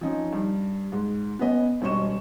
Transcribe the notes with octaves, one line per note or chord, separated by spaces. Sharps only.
F3 C4 C#4 D#4
G2
G#2
B3 C#4 B4 D#5
E1 G2 C4 D#5 C#6 E7